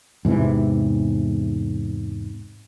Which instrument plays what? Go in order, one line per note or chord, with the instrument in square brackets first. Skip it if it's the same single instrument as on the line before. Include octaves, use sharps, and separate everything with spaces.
[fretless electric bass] E2 G#2 C3 E3